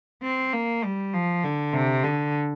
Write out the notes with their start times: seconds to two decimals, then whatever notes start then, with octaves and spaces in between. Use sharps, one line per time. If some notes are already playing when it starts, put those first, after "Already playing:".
0.23 C4
0.53 A#3
0.84 G3
1.14 F3
1.44 D3
1.73 C3
2.03 D3